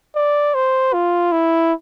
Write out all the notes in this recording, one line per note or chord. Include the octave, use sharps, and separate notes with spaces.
D5
C5
F4
E4